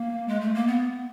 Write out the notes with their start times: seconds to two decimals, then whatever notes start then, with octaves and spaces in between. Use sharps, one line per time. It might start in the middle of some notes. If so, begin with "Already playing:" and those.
Already playing: A#3
0.28 G#3
0.41 A3
0.55 A#3
0.67 B3